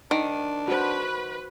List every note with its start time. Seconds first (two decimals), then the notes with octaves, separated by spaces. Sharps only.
0.11 D#3 D4
0.68 F#4 B4 C5